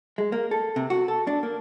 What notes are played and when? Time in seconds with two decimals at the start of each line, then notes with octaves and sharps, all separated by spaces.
0.18 G#3
0.32 A#3
0.51 A4
0.76 C3
0.90 F#4
1.08 A4
1.27 D4
1.43 A#3